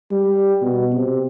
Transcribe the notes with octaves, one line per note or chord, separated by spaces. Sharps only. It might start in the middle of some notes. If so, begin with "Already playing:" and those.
G3
B2
C3